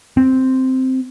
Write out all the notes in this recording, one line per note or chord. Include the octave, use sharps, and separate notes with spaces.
C4